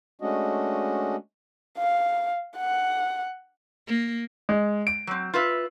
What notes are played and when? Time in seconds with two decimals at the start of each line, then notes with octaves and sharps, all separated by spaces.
0.21 G#3 A3 C#4 D4 F#4 D#5
1.78 F5
2.58 F#5
3.87 A#3
4.49 G#3
4.87 D7
5.07 F#3 C4
5.34 F4 B4 E5